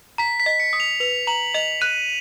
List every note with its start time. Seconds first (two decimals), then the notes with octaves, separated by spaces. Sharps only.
0.18 A#5 B6
0.40 B6
0.46 D#5
0.60 C#7
0.73 D#6
0.80 F7
1.00 B4 F7
1.27 A#5 F#7
1.54 D#5 F7
1.81 F#6 D#7